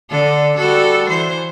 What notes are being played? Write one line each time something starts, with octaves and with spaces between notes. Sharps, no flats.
D3 A4
G3 F#4 A4
E3 C5